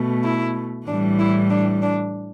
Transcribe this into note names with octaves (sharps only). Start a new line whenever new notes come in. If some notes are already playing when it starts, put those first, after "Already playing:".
Already playing: B2 A3
E4
A2 E3 G3 D4
E4
D4
D4